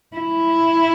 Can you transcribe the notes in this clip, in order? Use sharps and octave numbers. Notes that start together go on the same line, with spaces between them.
E4